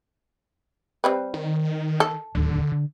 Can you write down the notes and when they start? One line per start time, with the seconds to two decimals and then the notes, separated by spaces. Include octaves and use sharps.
1.04 G3 C4 B4
1.34 D#3
2.00 A4
2.35 D1 D#2 D3
2.72 D3